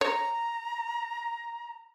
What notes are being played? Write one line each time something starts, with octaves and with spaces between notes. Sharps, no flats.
C#5 A#5